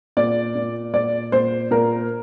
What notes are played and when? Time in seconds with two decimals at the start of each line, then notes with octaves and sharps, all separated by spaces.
0.17 A#2 D5
0.55 A#2
0.93 A#2 D5
1.32 A#2 C5
1.71 A#2 A#4